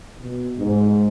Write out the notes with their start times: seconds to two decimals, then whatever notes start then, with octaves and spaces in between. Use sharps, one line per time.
0.21 B2
0.58 G#2